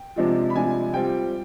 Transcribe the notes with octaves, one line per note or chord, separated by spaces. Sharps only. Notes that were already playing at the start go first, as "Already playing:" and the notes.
Already playing: G5
C3 F3 G#3 D4 F4
B5
C3 F3 G#3 D4 F4 G#5
G3 C4 F4 G5